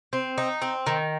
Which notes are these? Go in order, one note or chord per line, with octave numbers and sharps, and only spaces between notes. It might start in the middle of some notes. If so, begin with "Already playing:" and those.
C4
D#4
C4
D#3